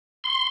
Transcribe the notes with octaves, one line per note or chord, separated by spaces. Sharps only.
C6